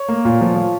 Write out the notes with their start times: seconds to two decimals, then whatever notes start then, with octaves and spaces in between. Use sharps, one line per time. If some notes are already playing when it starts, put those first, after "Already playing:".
Already playing: C#5
0.08 A#3
0.25 A#2
0.41 F3
0.56 F3